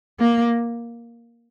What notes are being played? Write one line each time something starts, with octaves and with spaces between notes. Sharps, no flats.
A#3